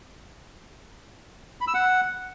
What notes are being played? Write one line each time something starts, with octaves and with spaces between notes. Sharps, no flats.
B5
E6
F#5